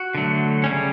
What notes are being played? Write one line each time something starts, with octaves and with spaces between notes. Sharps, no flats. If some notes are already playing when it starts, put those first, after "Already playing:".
Already playing: F#4
D3 F#3 A3
C#3 G3 C#4